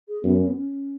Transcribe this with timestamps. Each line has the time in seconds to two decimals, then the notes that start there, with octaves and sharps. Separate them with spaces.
0.08 G#4
0.23 F#2 B3
0.38 C#4
0.47 B3
0.55 C#4